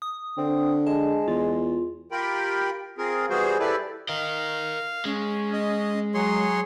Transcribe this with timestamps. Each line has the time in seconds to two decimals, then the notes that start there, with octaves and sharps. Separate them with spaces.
0.02 D#6
0.38 D3 C4
0.87 G#3 A5
1.28 E2 F4
2.12 F4 G4 A#4 G5 B5
2.98 C4 F4 G#4 A#4
3.30 E3 G3 B3 F#4 G#4 C5
3.60 E4 G4 A4 B4 D5
4.09 A#4 D#5 F5
5.05 G#3 C#4
5.53 D#5
6.14 F#3 G#4 C#5 C6